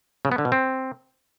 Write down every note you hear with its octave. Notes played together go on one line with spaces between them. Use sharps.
C#3
B3
D3
B2
C4